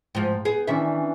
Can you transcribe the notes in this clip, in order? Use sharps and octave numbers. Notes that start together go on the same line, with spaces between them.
G#2 F3 G5
B3 G#4
D#3 E3 C#4 D4 E5